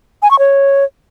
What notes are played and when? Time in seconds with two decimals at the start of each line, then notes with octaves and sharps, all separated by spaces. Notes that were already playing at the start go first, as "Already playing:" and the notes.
0.23 G#5
0.31 C#6
0.39 C#5